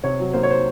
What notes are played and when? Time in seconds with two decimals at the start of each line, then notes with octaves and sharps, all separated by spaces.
0.03 C3 C#5
0.20 F#3
0.34 A#3 C5
0.43 C#5
0.51 C5